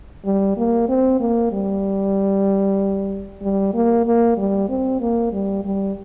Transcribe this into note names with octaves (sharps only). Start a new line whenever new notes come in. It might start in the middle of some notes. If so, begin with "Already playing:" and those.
G3
A#3
C4
A#3
G3
G3
A#3
A#3
G3
C4
A#3
G3
G3